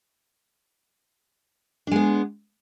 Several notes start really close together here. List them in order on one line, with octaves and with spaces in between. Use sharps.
D4 G#3 B3